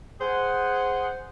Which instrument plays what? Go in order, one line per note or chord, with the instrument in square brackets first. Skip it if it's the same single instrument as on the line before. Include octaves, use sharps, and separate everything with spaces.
[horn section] G#4 C5 F#5